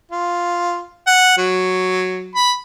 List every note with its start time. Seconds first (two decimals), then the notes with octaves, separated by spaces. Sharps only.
0.11 F4
1.07 F#5
1.38 F#3
2.35 B5